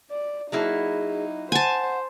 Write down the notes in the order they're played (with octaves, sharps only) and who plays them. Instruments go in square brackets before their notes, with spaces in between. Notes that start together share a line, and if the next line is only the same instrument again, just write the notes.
[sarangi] D5
[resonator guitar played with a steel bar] F#3 A#3 E4 [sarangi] D#4 [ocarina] G#4
[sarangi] C5 [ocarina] F#5 [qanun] G#5 A5